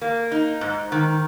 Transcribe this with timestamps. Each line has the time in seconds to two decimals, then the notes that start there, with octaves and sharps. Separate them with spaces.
0.02 A#3
0.32 D#4
0.61 G#2
0.92 D#3